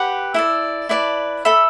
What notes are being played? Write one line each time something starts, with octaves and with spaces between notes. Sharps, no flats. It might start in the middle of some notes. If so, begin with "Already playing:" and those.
Already playing: G4 B4 F#5
E4 A4 D5
E4 B4 D5 A5
A4 E5 B5